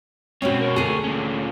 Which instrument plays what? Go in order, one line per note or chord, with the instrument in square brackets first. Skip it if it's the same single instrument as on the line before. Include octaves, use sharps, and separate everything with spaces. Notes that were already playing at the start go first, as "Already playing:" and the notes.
[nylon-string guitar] B2 G#3 C#4 [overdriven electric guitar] C4 C#5
[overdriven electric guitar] A#3 C#5
[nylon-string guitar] D2 G#4
[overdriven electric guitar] A#2 C#4